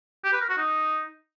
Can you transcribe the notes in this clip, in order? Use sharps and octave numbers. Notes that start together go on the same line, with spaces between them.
G4
B4
A#4
F#4
D#4